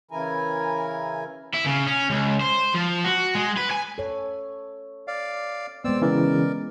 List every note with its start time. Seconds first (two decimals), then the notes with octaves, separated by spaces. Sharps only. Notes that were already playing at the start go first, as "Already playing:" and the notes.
0.11 C#3 E3 E4 A#4 G#5
1.54 E4
1.65 C#3
1.87 C#4
2.10 C#2
2.41 C5
2.75 F3
3.05 F#4
3.35 G#3
3.57 B4
3.71 G#5
3.98 A4 C#5
5.08 D5 F5
5.84 G#3 B3 C4 D5 E6
6.02 C#3 E3 A#4 D5